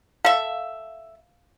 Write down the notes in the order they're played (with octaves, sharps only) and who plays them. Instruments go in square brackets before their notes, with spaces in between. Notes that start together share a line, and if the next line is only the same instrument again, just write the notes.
[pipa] A4 E5 [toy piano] F5